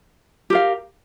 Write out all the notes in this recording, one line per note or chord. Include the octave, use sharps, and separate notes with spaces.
G4 A#4 F5